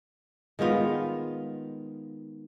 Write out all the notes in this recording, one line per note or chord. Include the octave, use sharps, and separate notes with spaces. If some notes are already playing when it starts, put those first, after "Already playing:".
D#3 G#3 B3 F4